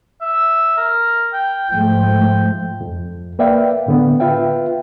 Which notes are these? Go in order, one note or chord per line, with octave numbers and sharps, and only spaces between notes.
E5
A#4
G5
G#2 F3 A3 G5
F2
A#3 B4 D5 E5 F5 G5
A2 D3 B3
F4 B4 E5 F5 G5